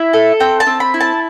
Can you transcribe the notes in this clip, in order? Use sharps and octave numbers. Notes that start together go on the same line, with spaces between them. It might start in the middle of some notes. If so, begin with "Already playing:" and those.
Already playing: E4 E5
A4
C4 G5
A5
C4
B5
E4
A5